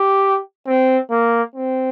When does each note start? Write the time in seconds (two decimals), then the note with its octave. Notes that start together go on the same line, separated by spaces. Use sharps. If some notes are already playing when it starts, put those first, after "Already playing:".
Already playing: G4
0.67 C4
1.11 A#3
1.56 C4